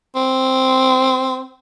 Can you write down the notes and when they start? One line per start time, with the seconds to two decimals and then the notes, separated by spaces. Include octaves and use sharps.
0.15 C4